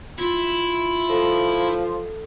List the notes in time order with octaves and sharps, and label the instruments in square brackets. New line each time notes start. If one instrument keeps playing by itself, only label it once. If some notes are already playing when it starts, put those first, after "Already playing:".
[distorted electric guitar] E4 [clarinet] F4
[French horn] F3 [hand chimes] A4